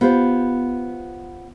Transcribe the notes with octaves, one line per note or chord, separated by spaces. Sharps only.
B3 F4 G4 C5